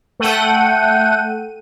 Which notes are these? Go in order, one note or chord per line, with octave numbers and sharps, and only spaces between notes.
A3 A4 F#5 G5 D#7